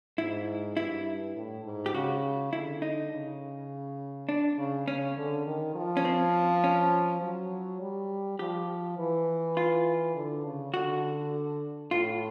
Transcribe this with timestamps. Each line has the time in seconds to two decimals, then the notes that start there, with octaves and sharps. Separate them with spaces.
0.18 G#2 E4
0.77 G2 E4
1.36 A2
1.65 G#2
1.86 G4
1.94 C#3 F#4
2.53 D3 E4
2.82 D#4
3.12 C#3
4.29 D4
4.59 C#3
4.88 C#3 C#4
5.17 D3
5.46 D#3
5.76 F3
5.97 C#4
6.05 C4
6.64 C#4
7.22 F#3
7.81 G3
8.39 F3 G4
8.99 E3
9.57 F4
10.15 D3
10.45 C#3
10.74 D3 F#4
11.91 A2 F4